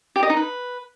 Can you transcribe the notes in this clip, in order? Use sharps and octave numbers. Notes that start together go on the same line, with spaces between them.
G4
D#5
D#4
B4